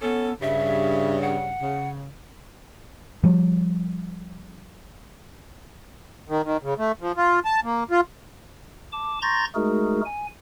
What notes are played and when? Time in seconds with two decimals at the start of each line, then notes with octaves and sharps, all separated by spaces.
0.02 B3 C#4 A4
0.42 G2 C#3 E5
1.21 F#5
1.61 C#3
3.24 F3 G3
6.29 D#3
6.44 D#3
6.63 C#3
6.78 A3
7.01 F3
7.17 F4
7.45 A5
7.64 A#3
7.91 F4
8.92 A5 D6
9.22 A#5 C6 C#6 G6 A6 A#6
9.55 G#3 A3 D#4 F#4 G#4 A#4
10.05 G#5